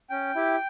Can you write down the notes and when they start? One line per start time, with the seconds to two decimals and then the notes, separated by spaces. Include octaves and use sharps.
0.10 C#4 G5
0.35 E4 G4